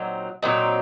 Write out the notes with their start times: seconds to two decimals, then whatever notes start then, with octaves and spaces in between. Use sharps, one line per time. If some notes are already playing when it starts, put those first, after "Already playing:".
Already playing: A#2 F#3 C4 D#4
0.43 A#2 F#3 C4 D#4